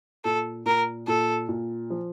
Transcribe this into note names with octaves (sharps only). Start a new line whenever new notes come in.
A#2 A4
A#2 A#4
A#2 A4
A#2
F3